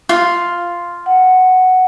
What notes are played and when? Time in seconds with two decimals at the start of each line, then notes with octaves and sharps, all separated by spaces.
0.09 F4
1.06 F#5